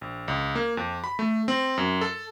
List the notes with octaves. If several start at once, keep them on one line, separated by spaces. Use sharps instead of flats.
A#1
C#2
A#3
F2
B5
A3
C4
F#2
A4